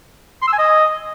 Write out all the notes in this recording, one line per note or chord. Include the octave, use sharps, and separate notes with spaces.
C6
E6
G#5
D#5